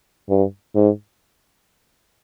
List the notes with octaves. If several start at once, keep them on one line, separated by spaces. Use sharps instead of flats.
G2
G#2